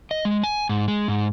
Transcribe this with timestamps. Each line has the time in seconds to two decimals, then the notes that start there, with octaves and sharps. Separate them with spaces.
0.11 D#5
0.25 G#3
0.43 G#5
0.69 G#2
0.88 G#3
1.08 G#2